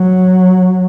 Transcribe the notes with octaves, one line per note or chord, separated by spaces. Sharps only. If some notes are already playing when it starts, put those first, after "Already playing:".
Already playing: F#3